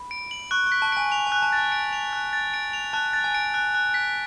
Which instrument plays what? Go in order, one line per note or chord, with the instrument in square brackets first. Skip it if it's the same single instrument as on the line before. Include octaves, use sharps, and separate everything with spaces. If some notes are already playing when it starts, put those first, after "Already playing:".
Already playing: [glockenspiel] B5
[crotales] D7
F#7
[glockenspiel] C#6 [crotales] F#6
[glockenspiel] C#6
[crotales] B6
[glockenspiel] A5
[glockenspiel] G#5 [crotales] D7
[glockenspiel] G#5 [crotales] F7
[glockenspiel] G#5
[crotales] F#6
[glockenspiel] A5
[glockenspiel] A5 [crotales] A6
[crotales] D7
F7
F#6
A6
D7
F7
[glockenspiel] A5 [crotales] F#6
[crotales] A6
[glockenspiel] G#5
[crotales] D7
F#6
F#6
B6